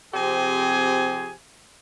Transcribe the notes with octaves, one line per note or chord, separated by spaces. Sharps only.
C3 F3 C4 G4 G#4 G#5